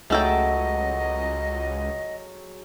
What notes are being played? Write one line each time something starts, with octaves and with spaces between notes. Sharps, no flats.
C#2 F#3 A3 G#4 A4 D#5 G5